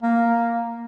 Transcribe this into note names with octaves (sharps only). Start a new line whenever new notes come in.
A#3